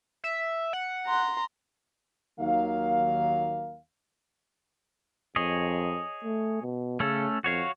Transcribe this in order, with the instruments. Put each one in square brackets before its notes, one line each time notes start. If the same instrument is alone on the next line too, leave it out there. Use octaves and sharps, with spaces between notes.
[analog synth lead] E5
F#5
[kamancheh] A#5 C6
[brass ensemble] D#2 D#3 F#3 A#3 F5
[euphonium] F2 [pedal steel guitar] G#4 C#5 D#5
[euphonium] A3
B2
[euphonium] C#3 [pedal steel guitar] A3 C#4 A4
[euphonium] F2 [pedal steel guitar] F#4 C#5 F5